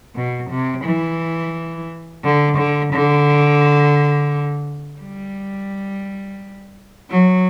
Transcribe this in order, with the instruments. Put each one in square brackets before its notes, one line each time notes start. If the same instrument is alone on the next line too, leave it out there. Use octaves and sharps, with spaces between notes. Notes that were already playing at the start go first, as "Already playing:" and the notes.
[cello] B2
C3
E3
D3
D3
D3
G3
F#3